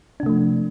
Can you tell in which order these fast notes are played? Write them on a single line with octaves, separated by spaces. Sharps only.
D4 C3 A3 F3